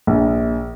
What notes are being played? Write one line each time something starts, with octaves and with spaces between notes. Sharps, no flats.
A#1